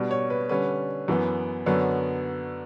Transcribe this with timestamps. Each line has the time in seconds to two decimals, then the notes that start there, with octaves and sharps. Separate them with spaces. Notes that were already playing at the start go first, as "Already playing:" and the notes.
Already playing: B2 G3 D4
0.11 C#5
0.30 B4
0.49 D3 G3 C#4 B4
1.08 F#2 E3 B3
1.66 F#2 D3 F#3 B3 C#5